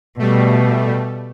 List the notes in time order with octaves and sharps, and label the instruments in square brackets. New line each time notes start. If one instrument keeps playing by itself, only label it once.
[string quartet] B2 [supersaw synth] G3 A3